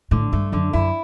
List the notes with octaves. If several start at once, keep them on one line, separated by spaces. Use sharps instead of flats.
A2 D3
G2 A3
F#2 D3
F#2 E4